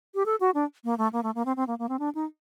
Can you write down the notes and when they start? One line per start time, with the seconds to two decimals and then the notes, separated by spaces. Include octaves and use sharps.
0.15 G4
0.26 A4
0.40 F#4
0.55 D4
0.84 A#3
0.98 A3
1.13 A#3
1.23 A3
1.35 A#3
1.46 C4
1.56 C4
1.67 A#3
1.79 A#3
1.89 C4
1.99 D4
2.15 D#4